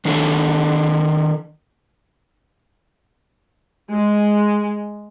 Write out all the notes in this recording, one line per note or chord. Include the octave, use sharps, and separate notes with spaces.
D#3 D4 A4 C#5
G#3